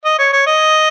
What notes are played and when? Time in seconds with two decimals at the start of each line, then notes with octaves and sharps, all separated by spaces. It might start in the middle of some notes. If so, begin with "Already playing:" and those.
0.05 D#5
0.19 C#5
0.33 C#5
0.47 D#5